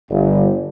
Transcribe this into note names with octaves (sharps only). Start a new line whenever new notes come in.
G1